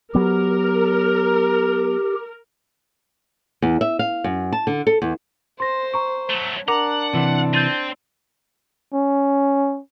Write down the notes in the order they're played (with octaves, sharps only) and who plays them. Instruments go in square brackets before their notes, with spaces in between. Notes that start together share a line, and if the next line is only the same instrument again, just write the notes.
[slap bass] F#3 B3 [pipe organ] G4 [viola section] A#4
[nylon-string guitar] E2
E5
F5
F#2
A5
D3
A4
E2
[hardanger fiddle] C5 [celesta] C6 A#6
[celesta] A#5 C#6
[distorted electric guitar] F#3 A3
[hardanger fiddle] D4 [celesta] A#4 D6 [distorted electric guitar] F#5 [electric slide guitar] A#5
[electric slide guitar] C3 E3
[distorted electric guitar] C4 [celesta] G6 A6 D#7
[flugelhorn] C#4